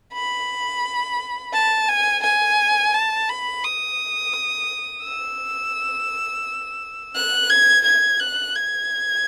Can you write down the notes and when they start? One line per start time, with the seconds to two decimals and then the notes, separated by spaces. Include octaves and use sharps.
0.13 B5
1.53 A5
1.88 G#5
2.23 G#5
2.94 A5
3.29 B5
3.64 D#6
5.04 E6
7.15 F#6
7.50 G#6
7.85 G#6
8.20 F#6
8.55 G#6